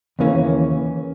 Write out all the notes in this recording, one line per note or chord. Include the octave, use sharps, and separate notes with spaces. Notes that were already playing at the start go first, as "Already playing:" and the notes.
D#2 C#3 E3 A#3 C#4